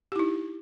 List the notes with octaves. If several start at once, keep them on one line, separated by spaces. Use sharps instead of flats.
D#4 E4 G4